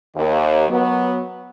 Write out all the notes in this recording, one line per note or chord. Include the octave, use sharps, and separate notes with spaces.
D#2
F#3 B3